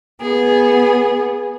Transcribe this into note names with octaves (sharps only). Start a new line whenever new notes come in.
B3 G#4